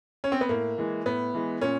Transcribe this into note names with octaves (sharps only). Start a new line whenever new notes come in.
C#4
C4
B3
A2 A#3
E3 G#3
A2 B3
E3 G#3
A#2 C#4